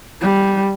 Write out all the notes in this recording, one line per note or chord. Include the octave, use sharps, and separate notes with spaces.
G3